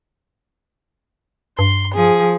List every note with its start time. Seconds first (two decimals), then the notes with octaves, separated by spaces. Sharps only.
1.59 G2 C6
1.95 F3 G#4